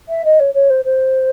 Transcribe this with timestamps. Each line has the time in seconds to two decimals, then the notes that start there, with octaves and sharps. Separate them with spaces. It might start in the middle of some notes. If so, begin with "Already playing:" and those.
0.09 E5
0.24 D#5
0.39 C#5
0.54 C#5
0.70 C5
0.84 C5